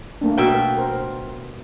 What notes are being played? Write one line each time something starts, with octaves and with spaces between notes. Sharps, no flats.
A3 A#3 D4
B2 A#4 E5 G5
A#4 C5